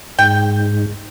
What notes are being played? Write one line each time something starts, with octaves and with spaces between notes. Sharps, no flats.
G#2 G5